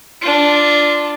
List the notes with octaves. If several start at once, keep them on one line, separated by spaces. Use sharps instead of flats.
D4 F4